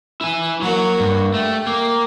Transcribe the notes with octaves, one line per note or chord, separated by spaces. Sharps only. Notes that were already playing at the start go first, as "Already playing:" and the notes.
E4 G#5
F#3 A#3 F#4 A#4
G2
A3 G4
A#3